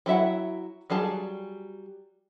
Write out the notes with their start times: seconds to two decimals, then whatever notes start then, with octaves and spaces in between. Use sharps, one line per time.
0.06 F#3 E4 E5 F#5
0.90 F#3 G3 G#4 A5